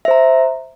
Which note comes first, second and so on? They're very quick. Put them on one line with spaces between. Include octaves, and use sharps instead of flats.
E5 C5 A#5